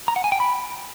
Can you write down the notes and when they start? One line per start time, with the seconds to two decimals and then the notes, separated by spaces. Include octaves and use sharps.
0.08 A#5
0.16 F#5
0.24 G#5
0.32 G5
0.40 B5